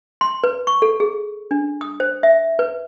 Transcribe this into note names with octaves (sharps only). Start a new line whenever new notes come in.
C6
B4
C#6
A4
G#4
D4
D#6
C5
E5
B4